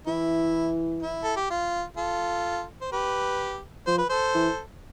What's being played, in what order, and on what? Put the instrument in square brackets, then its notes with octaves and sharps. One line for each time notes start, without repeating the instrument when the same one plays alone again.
[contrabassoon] E3 [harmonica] E4
[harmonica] E4
A4
G4
F4
F4 A4
C5
G4 B4
[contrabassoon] F3 [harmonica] C5
[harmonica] B4
A4 C5
[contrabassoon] E3